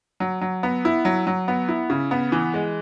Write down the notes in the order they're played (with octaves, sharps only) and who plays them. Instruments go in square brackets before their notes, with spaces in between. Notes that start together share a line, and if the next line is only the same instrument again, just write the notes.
[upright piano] F#3
F#3
B3
E4
F#3
F#3
B3
E4
C#3
B3
E3
G#3